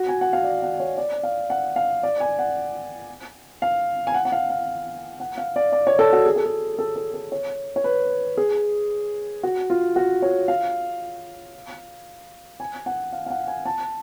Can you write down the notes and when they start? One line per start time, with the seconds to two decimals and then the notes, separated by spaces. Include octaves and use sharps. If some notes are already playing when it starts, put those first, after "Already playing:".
Already playing: F#4
0.08 G#5
0.21 F#5
0.33 F5
0.44 D5
0.62 F#5
0.80 C#5
0.98 D5
1.23 F5
1.50 F#5
1.76 F5
2.03 D5
2.20 G#5
2.39 F#5
3.62 F5
4.07 G#5
4.14 F#5
4.25 F#5
4.32 F5
4.50 F5
5.20 F#5
5.38 F5
5.56 D5
5.72 D5
5.87 C#5
5.99 A4
6.13 F#4
6.26 G#4
6.36 A4
6.46 G#4
6.79 A4
6.96 A4
7.14 A4
7.32 C#5
7.76 C#5
7.84 B4
8.37 G#4
9.43 F#4
9.70 F4
9.96 F#4
10.22 C#5
10.48 F5
12.60 G#5
12.86 F#5
13.13 F5
13.26 F5
13.30 F#5
13.47 G#5
13.66 A5